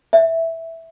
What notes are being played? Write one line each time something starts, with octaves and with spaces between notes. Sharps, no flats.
E5